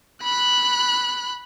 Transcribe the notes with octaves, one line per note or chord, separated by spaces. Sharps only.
B5 F#6